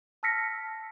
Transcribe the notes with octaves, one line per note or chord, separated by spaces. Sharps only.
A5 E6 F6 A#6 B6 C#7